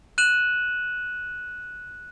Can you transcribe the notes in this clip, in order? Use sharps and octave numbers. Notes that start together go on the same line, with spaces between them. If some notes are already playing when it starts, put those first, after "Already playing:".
F#6 D#7 E7 F#7